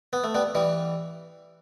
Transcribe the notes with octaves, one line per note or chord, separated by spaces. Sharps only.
B3
A3
G3 B3
E3 G3